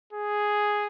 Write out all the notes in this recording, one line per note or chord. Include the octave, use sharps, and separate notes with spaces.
G#4